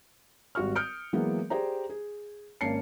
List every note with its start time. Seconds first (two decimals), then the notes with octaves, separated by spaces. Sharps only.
0.55 G#1 G3 F#4 C#6 F6
0.76 D#6 F6 G6 C#7 D7
1.13 E3 F#3 G#3 A#3 B3
1.50 G4 G#4 C5 D5 A#5
1.90 G#4
2.61 G#1 A#3 C#4 A5 C7 C#7